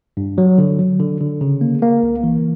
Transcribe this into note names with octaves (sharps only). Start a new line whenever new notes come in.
G2
F#3
D3
F#3
D3
D3
C#3
A#3
A#3
C#2
E3